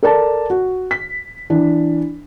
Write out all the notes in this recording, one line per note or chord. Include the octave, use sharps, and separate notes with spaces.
A4 A#4 D5 A5
F#4
B6
E3 D4